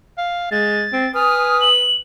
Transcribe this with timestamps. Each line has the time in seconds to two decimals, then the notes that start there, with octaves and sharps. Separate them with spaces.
0.18 F5
0.51 G#3 A6
0.93 C4
1.15 B4 G#5 D#6 F6
1.61 F#7